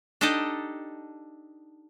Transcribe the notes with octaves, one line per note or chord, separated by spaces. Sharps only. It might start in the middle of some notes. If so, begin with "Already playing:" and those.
D4 D#4 G4 A4 D#5